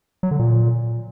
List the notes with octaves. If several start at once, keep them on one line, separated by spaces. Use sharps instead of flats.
F#3
D3
A#2